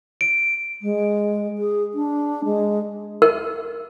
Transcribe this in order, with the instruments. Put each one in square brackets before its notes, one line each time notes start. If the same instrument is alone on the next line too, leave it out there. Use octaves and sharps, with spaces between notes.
[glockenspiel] D7
[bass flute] G#3
G#4
D4
G#3
[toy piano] A#4